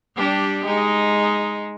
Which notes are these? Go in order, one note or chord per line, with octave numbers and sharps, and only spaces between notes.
G3 D4 G4
G#3 D#4